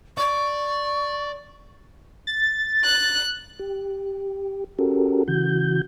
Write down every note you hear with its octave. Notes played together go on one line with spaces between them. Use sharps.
D5 C#6
A6
F#6
G4
C#4 F#4 G4 A4 A#4
C#3 E3 F#4 G6